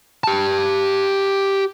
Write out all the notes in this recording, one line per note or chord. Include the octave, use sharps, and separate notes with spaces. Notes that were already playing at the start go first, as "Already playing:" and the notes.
G4 A5